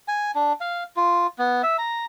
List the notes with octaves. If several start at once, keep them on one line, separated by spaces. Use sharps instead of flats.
G#5
D4
F5
F4
B3
E5
A#5